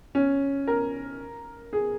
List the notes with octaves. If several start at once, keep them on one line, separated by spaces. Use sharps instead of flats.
C#4
A#4
G#4